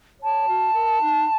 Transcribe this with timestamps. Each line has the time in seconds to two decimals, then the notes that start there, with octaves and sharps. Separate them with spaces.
0.22 C#5 A5
0.48 F#4
0.74 A#4
1.01 D#4